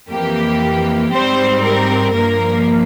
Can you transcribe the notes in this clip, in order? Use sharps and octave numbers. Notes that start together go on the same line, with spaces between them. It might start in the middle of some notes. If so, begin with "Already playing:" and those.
F2 E3 A#3 G4
G#2 G3 C4 C5
A#4
G2 F3 A#3 A#4